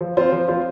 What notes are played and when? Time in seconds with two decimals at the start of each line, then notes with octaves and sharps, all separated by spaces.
0.01 F3
0.17 C4 F4 C5
0.32 F3
0.48 C4 F4 C5